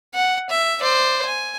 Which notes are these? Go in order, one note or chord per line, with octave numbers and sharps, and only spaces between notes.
F#5
E5
C5 D5
G#5